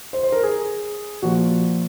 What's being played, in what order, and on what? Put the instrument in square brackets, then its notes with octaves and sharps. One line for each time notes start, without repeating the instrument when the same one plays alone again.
[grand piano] C5
C5
A#4
G#4
A#2 F3 F#4